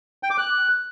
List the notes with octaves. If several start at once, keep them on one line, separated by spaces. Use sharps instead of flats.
G5
D6
F#6